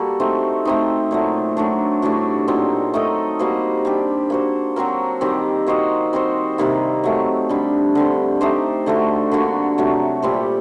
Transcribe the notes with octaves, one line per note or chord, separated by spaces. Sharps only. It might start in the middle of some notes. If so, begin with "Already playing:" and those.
Already playing: G3 A#3 F#4 A4
A3 C4 D#4
A3 C4 D#4
A#2 F#3 A3
F#3 A3 D4
A2 G3 D4 F#4
A#2 F#3 C4 D#4
A3 D#4 A4 D#5
G3 A#3 F#4 C5
G3 D4 G4
A#3 F#4 C5
F#3 C4 F#4 A#4
D#3 G3 C4 G4
A#3 F#4 C5 D#5
G3 C4 F#4 C5
C3 D#3 G3 A#3
F#3 A3 C4
D3 G3 D4
D3 G3 C4
A3 D#4 G4 C5
D3 A3 D4 F#4
D3 G3 A#3 F#4
C3 F#3 A3
A#2 G3 C4 G4